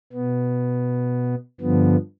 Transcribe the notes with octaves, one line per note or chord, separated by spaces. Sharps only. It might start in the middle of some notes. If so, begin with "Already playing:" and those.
B2 B3
G2 D3 F3 B3